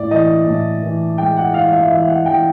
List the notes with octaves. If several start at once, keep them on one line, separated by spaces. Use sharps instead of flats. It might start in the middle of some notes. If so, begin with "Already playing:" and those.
Already playing: A2 D5
E3 D#5
A2
E3
G#3 G5
F#5
E3 F5
F5
E5
E3 E5
F#5
E3 G5